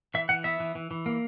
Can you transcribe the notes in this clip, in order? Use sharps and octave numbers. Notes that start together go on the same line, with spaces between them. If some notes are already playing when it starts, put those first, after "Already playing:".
E3 E5
E3 F#5
B3 E5
E3
E3
E3
A#3